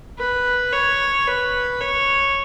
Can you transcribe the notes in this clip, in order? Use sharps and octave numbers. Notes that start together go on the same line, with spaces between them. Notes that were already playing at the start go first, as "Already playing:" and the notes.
B4
C#5
B4
C#5